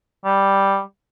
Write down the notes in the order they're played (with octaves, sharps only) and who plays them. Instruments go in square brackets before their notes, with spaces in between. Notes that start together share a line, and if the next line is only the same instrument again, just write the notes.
[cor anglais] G3